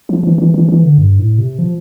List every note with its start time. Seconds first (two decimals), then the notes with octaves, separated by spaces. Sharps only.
0.09 F3
0.23 E3
0.38 E3
0.54 E3
0.68 E3
0.84 D3
0.98 G2
1.19 A2
1.38 C3
1.59 F3